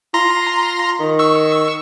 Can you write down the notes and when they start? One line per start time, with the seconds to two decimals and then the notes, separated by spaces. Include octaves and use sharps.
0.14 F4 A#5 C6 A#6
1.00 D#3
1.19 C#6 E6